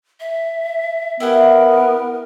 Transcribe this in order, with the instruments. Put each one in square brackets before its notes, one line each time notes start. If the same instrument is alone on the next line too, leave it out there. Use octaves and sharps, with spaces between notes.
[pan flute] E5
[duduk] B3 [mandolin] E4 G4 F#5 [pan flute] A#4